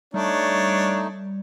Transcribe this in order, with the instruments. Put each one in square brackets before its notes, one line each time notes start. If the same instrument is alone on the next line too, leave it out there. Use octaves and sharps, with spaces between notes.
[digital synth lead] G3 [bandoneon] A3 D#4 [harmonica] D4 [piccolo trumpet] C#5